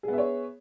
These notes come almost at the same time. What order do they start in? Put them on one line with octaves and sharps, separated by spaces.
G#4 B3 E5 C#5